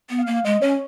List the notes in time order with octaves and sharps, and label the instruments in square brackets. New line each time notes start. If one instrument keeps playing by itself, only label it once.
[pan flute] B3
[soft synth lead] F5
[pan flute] A#3
[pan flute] G#3 [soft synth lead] D#5
[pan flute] C#4 [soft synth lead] C#5